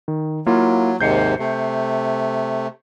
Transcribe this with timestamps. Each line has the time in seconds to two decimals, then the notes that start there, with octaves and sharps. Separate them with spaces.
0.08 D#3
0.46 F#3 A#3 E4 F4
1.01 D#2 G#2 C3 G6 C7 C#7
1.39 C3 A3